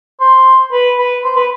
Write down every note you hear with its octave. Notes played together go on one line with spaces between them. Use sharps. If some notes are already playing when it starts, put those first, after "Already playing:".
C5
B4
B4
C5
B4